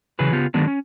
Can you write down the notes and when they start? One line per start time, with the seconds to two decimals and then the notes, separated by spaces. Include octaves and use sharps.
0.19 C#3 E3 F#3 G#4 B4
0.32 C#3 B3 F4 G4
0.54 D3 D#3 F#3 G#3 B3 D4
0.67 C#4